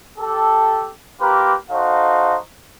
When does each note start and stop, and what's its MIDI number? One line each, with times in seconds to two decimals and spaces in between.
0.19 0.90 67
0.19 0.90 69
1.21 1.55 58
1.21 1.55 65
1.21 1.55 67
1.21 1.55 70
1.21 1.55 71
1.71 2.37 63
1.71 2.37 66
1.71 2.37 69
1.71 2.37 72
1.71 2.37 77